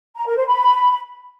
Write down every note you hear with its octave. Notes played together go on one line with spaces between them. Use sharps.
A#5
A#4
C5
B5